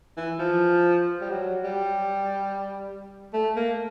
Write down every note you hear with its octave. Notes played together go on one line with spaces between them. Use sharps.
E3
F3
G3
F#3
G3
A3
A#3